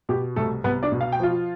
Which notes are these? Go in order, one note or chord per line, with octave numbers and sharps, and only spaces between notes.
B2 G4
C2 A3 A4
C2 B3 B4
D4 D5
B2
F5
G5
F3 F4 F5